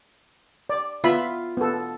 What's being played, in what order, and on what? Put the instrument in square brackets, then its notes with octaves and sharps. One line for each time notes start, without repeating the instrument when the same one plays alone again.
[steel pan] D5
[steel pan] B3 E5 B5 [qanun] F4
[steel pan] B3 A4